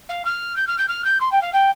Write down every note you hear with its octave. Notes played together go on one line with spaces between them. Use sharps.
F5
F6
G6
F6
G6
F6
G6
C6
G5
F5
G5